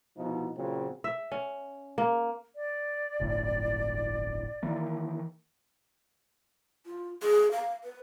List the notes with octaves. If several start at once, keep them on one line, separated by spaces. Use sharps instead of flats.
C2 B2 F3 D#4
A#2 C#3 F#3 C4
E5
C#4
A#3
D5
D1 G1 A2
D#3 E3 A#3
F4
G#4
F5
B4